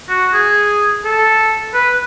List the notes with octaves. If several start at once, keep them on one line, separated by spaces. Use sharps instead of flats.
F#4
G#4
A4
B4